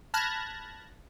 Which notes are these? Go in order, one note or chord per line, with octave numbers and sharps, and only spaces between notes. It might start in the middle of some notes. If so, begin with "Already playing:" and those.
A5 B5 F6 F#6 G#6 A#6